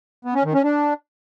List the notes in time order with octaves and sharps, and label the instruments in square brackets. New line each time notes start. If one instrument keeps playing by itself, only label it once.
[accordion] B3
C#4
D#3
C#4
D4